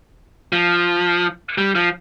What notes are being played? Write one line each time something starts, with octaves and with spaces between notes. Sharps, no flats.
F3
G3
F3